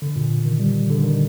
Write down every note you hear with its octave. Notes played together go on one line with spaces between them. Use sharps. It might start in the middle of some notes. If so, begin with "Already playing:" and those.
D3
A#2
D#3
G3
D3
D#3